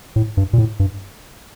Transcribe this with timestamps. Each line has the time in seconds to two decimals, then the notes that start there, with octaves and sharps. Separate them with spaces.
0.16 A2
0.37 G2
0.53 A#2
0.58 A2
0.80 G2